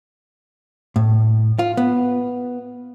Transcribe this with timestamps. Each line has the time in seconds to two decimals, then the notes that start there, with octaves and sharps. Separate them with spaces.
0.96 A2
1.59 F4
1.77 B3